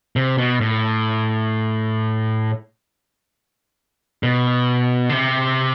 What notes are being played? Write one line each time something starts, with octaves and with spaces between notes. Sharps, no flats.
C3
B2
A2
B2
D3
C3